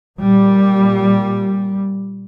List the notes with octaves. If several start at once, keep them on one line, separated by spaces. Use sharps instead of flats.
A#2 G3